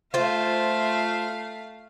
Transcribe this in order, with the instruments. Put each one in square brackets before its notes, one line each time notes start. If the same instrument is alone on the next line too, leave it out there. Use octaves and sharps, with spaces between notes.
[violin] A3 F5 [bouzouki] F4 C5